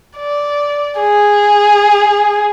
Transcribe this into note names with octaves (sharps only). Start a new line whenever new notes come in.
D5
G#4